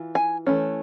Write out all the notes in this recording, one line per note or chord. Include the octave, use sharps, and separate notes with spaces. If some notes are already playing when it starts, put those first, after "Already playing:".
Already playing: E3 F4
G#5
E3 A3 C#4